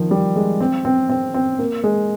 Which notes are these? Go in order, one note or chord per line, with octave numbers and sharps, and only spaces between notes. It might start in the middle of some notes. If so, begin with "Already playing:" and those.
Already playing: D#3 F3
G3
G#3
C4
C4
C4
C4
A#3
G#3